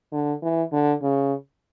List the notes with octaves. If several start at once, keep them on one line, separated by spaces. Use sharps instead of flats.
D3
E3
D3
C#3